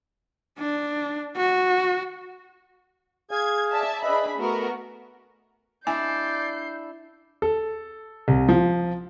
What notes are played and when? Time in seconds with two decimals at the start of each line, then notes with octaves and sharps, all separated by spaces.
0.59 D4
1.37 F#4
3.31 G#4 F5 G#5 G#6
3.73 D5 E5 A5
4.03 D4 G#4 B4 D#5 E5 B5
4.39 A3 B3 F#4 A#4
5.87 D4 E4 D5 G#5 G6 C7
7.42 A4
8.28 C2
8.49 F3